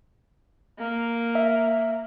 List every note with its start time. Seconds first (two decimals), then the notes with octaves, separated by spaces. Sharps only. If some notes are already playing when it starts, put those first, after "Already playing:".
0.79 A#3
1.35 E5